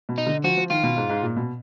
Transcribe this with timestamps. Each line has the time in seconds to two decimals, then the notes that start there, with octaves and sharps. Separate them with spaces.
0.09 B2
0.18 D#4
0.27 D3
0.44 F3 F#4
0.57 F3
0.70 D#3 F4
0.83 B2
0.97 G#2
1.10 G#2
1.23 A#2
1.36 B2